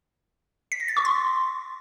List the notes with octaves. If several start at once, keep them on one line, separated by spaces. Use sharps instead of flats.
B6
A#6
A6
C#6
C6